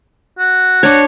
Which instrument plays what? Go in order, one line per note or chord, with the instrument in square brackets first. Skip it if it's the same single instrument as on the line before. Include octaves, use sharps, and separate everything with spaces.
[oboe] F#4
[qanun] D4 C#5